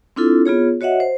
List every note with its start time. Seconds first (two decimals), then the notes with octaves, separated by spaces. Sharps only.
0.16 C4 D4 E4 F4 A4
0.45 B3 F4 G#4 C#5
0.81 F#4 C#5 D#5 E5 F#5
1.00 C5